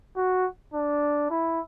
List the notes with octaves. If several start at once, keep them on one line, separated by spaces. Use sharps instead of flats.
F#4
D4
E4